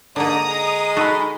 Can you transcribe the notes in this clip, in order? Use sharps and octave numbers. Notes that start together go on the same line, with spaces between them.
G#2 D3 A#3 A#5 D#6
G#3
D#4 F#4 A4 B5